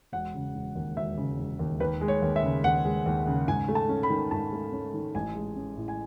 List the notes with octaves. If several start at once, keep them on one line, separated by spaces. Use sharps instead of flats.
E1 F#5
C#3
E1
D#2
E1 E5
C#3
E1
D#2
D#2 B4
G#3
C#5
D#2
E5
C#3
D#2 F#5
G#3
D#2
C#3
G#2 G#5
A3
A5
C#4
B5
D#3
G#2 A5
A3
C#4
D#3
A1 G#5
G#3
C#4
A2
G#5